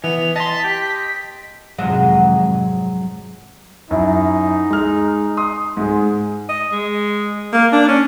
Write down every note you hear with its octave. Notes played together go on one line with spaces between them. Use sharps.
E3 B3 F7
D#5 A5 C6 B6
G4
G#1 F2 C3 F3 F#3 G#3
F#2 D#4 E4
G#3 F6
C6 D#6
G#2 G#3
D#5
G#3
A#3
D4
C#4